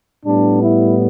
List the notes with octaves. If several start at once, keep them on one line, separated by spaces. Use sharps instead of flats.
A2 G3 B3 D4
E4